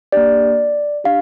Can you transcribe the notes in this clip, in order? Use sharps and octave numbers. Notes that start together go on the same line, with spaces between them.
A#3 D4 G4 D5
D4 G4 F5